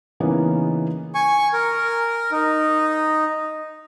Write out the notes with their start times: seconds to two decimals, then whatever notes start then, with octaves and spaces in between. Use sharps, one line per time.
0.20 C#3 E3 A#3 B3 C#4 D#4
1.15 G#5 C#6
1.53 A#4
2.32 D#4